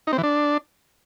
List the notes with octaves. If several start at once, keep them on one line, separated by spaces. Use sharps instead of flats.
D#4
C4
E3
D4